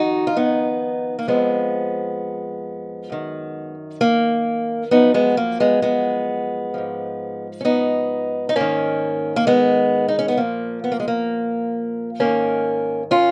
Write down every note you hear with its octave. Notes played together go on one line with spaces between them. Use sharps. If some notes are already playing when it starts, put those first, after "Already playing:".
Already playing: F2 D#3 D#4 F#4
F4
B3 D#4
A#3
F2 F3 G#3 B3
F#2 D#3
A#3
F#2 F3 B3 D#4
G#3 B3
A#3
G#3 B3
G#3 B3
G#2 F3
C#4
B3 D#4
D#4
G#2 D#3 A#3 C#4
A#3
G#3 B3
D#4
C#4
B3
A#2 F3 A#3
B3
A#3
G#3
A#3
G#2 D#3 A#3 C#4
C#4 F4